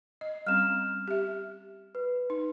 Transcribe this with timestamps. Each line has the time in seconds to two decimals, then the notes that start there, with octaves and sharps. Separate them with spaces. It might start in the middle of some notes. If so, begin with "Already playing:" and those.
0.21 D#5
0.47 G3 C4 C#4 F6 E7
1.08 G4 E5
1.95 B4
2.30 D#4